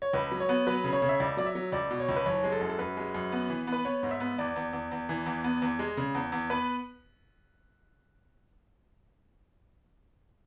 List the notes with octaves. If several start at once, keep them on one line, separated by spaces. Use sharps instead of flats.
C#5
C#2 B4
F#3
C#5
B3
F#3 B4
C#3
C#5
C#3
E5
C#2 D5
F#3 D5
E5
F#3
C#2 D5
B2
C#5
C#2
B4
F#1 C#5
G#3
A4
F#2
A4
F#2 B4
G#3
F#2
B3
E3
B3
B4
B3 C#5
G#2
E5
B3
E2 D5
E2
E2
E2
E3
E2
B3
E2
G#3
C#3
E2
E2
B3 B4